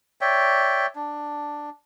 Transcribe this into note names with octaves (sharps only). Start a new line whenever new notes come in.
C#5 D5 E5 G5
D4